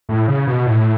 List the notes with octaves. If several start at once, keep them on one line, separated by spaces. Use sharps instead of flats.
A2
C#3
B2
A2